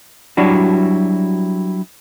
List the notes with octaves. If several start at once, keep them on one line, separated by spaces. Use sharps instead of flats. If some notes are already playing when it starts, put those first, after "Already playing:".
F#3 G3 D4 E4 F#4